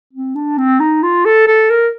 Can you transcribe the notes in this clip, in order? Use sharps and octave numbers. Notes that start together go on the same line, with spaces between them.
C4
D4
C4
D#4
F4
A4
A4
A#4